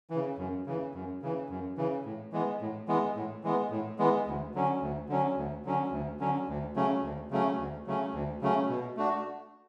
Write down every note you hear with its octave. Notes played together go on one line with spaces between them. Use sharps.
E3
C#3
F#2
C#3 E3
F#2
C#3 E3
F#2
C#3 E3
A2
E3 G#3 B3
A2
E3 G#3 B3
A2
E3 G#3 B3
A2
E3 G#3 B3
D2
D3 F#3 C#4
D2
D3 F#3 C#4
D2
D3 F#3 C#4
D2
D3 F#3 C#4
D2
C#3 F#3 A3 C#4
D2
C#3 F#3 A3 C#4
D2
C#3 F#3 A3 C#4
D2
C#3 F#3 A3 C#4
B2
A3 D4 F#4